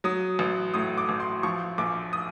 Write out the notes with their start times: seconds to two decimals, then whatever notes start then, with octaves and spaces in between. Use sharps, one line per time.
0.04 F#3 D#6
0.39 A1
0.74 A2 D#6
0.98 D6
1.09 A1
1.20 C6
1.43 F3 C#6
1.78 A#1 D6
2.13 D#6